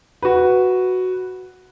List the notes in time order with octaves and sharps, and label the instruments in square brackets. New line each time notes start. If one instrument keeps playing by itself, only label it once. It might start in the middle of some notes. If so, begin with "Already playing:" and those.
[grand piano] F#4 B4